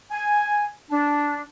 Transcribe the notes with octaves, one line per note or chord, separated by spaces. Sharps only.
G#5
D4